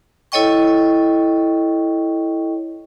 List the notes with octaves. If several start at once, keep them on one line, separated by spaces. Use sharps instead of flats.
E4 A4 C#5 D#5 G5 C#6